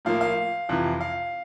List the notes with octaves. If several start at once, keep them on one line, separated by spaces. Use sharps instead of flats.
A2 F3 A#3 F5
F5
F2 C3 E3
F5